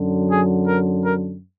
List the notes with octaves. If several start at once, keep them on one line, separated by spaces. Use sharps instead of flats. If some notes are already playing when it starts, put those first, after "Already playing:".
Already playing: F#2 D3 F#3
G#4
A#4
A#4